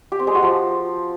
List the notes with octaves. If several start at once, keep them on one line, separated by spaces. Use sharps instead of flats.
G4
C4
G#3
F#4
F3